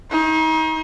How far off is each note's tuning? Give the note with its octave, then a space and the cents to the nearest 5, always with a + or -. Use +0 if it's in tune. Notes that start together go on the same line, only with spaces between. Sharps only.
D#4 +35 C#6 -45